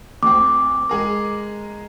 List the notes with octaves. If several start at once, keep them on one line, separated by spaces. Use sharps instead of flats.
D2 C4 D6
G#3 G#4 A#4